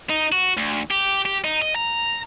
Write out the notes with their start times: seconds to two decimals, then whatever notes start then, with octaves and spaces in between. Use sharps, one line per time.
0.10 D#4
0.32 F#4
0.57 D2
0.91 G4
1.25 G4
1.44 D#4
1.62 D#5
1.75 A#5